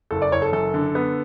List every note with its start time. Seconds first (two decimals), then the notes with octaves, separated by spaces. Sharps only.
0.11 F#1 A4
0.22 D5
0.31 F#1 C#5
0.42 A4
0.52 F#2 A4
0.74 D3
0.95 B3